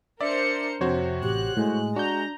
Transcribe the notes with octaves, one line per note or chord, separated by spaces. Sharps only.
D4 A#4 C5 D5 E5 C#7
F2 C3 F#4 C5 C#5
A1 G4 F#6
A2 G#3
D4 F#4 A#5 G6